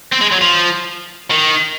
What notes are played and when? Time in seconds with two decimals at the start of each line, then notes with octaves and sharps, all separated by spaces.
0.12 C4
0.21 G#3
0.32 F#3
0.41 F3
1.31 D#3